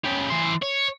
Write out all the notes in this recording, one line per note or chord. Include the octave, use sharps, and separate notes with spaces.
C#3 G4
E3 C5
C#5